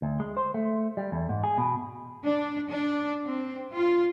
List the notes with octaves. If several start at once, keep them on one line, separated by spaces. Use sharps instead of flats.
D2
G#3
C5
A3
G3
E2
G#2
G#4
B2
D4
D4
C4
F4